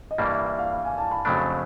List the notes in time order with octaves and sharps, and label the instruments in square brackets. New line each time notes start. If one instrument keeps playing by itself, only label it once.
[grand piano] D#5
[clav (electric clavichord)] G2 E3 G3 A#3 [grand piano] D5
[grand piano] E5
E5
F5
F5
G#5
A5
B5
[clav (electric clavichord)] F2 C#3 F#3 A3 D4 [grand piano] B5